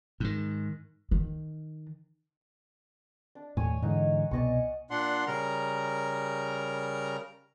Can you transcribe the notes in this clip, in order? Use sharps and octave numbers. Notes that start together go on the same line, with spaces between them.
G#2 D#3
D#3
D4
D#2 A2 C#5 G#5 C#6
G#2 D3 E3 D#4 F#5
C2 B2 B3 D5 D#5 C#6
A#2 D4 F#5 C6
C#3 G3 A#4 A#5